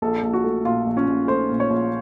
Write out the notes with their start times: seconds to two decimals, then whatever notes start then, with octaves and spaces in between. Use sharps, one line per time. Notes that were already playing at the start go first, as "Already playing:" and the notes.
0.02 A#1 A4
0.23 A#1
0.33 F#4
0.44 A3
0.65 A#2 F4
0.87 A#1
0.97 C#4
1.08 A#1
1.28 A3 C5
1.49 A#2
1.60 C#5
1.70 A#1